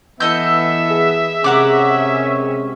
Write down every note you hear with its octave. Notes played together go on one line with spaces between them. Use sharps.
E3 B3 A4 D#5 E5 E6 G6
G#4
C3 G#3 C#4 A#4 F#5 D6